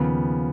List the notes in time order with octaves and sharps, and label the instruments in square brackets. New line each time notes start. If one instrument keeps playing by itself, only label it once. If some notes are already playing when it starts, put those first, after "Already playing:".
Already playing: [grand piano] D#2 C#3 F3 B3